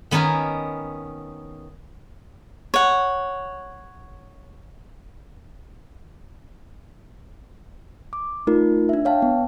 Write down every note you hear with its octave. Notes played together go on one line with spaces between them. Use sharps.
D#3 B3 C#4 A#4 G#5
C#5 F#5
D6
A3 D#4 F4 A#4
D4 E5
C#5 F5 G5 A5
B3